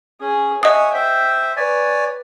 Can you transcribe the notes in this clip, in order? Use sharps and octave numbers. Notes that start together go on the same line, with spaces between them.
C#4 G#4 G#5
C#5 D#5 E5 F#5 G#5 D#6
C5 E5 G5
B4 C#5 D5 G#5